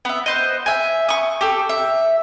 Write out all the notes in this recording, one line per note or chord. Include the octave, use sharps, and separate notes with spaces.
B3 E5
B4 C5 D#5
E5 G#5
C#6 D#6
G4 A4
E5